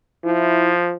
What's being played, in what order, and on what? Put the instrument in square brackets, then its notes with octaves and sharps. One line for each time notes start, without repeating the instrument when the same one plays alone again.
[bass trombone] F3 [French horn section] E4